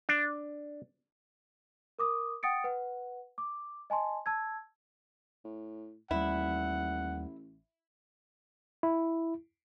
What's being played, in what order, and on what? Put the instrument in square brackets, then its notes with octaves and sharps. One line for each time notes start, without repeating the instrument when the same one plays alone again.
[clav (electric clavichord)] D4
[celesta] A#4 D6 D#6
F#5 G5 D#6 A6 C#7 D7
B4 F#5
D6
D#5 G#5 A5 C6
A5 E6 G#6
[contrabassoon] A2
[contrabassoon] A1 [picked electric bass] D#2 G3 [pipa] E4 [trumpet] F#5
[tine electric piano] E4